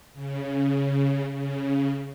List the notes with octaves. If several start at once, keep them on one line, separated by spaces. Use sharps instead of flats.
C#3
C#3